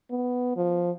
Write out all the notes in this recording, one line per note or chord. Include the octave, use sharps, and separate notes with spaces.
B3
F3